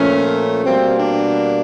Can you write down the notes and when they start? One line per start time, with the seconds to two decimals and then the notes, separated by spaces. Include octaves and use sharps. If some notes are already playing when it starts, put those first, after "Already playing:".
Already playing: A#2 F3 A3 C#4
0.64 B2 G3 A#3 C4
0.97 D4